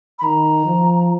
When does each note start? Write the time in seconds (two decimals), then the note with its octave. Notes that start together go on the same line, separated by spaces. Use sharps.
0.19 B5
0.23 D#3 A#5
0.66 F3